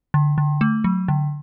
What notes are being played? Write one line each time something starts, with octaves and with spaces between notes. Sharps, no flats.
D3
D3
A3
F#3
D3